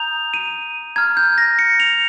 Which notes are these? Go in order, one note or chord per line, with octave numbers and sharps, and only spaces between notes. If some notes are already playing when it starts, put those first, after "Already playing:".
Already playing: A#5 D#6 G6 F7
D#7
A#5 F6 G#6
G6
A#6
C#7
F7